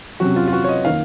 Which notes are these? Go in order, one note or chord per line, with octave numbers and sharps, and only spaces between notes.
C3 F#3 C#4 F#4
F4
F4
F#4
C#5
D#5
D#3 A#3 F5